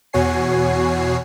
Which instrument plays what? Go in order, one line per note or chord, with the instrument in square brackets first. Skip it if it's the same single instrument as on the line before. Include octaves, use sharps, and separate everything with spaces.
[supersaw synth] E2 B2 F#4 C#5 G#5 C7